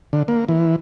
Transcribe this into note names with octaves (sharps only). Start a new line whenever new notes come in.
D3
A#3
E3